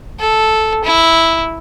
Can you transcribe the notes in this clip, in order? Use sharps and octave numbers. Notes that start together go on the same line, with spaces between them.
A4
E4